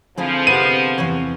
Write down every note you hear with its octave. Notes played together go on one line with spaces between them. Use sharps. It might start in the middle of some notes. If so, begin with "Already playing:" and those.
D3 F3 C4 E4 G#4
C3 B3 D#7
E2 C3 E3 C#5 F5